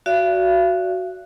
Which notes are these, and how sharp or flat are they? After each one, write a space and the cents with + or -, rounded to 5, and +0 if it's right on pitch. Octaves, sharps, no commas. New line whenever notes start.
F#4 +0 D5 -10 F5 -45